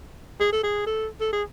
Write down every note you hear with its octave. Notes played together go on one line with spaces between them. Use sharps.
G#4
A4
G#4
A4
A4
G#4